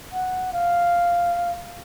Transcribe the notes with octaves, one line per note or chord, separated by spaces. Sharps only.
F#5
F5